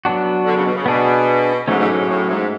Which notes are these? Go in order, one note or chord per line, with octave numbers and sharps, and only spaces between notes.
F#3 B3 D4 F#4
D3
C#3
B2
C#3
B2 B3 D4 G#4
G#2 F#3 A3 C#4
G#2
A2
G#2
A2
G#2